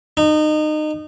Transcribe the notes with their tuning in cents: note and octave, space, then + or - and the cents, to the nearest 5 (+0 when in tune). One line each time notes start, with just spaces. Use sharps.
D#4 -25